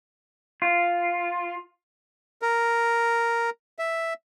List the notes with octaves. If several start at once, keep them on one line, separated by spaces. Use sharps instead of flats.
F4
A#4
E5